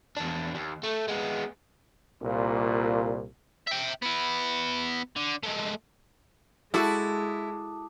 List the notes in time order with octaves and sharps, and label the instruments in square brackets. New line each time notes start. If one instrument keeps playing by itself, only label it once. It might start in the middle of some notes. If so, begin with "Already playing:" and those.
[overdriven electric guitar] E2 D4
D#2
A3
G#3 B3
[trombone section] C2 A#2
[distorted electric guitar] E5 G5
B3 E4
D3
G#3 A3
[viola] G#3 [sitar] E4 [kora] F#4 A4 [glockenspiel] A5 D6 D#6